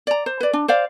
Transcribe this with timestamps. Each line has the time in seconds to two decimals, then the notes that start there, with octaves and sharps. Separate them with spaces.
0.07 D5 A#5
0.26 C5
0.40 B4 D5
0.53 D4
0.68 C5 D5 F5